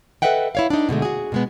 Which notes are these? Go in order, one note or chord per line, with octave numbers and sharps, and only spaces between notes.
A4 B4 D#5 E5 F#5 G5
E4 C#5 F5
D4 D#4
B2 D3 G#3 A3
F#4 G#4
B2 G#3 B3